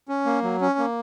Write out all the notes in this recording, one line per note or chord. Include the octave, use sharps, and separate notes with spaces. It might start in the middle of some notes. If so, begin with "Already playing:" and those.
C#4
A#3
F#3
C#4
A#3